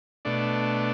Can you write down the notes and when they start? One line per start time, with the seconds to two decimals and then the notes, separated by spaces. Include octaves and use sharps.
0.25 B2 A3 D4